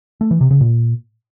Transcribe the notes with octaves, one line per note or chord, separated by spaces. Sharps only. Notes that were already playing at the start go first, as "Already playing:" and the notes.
A3
E3
C3
C#3
A#2